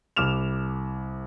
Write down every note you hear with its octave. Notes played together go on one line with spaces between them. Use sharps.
C2 D6 F6 E7 F7